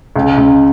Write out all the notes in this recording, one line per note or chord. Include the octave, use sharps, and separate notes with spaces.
C#2
C#2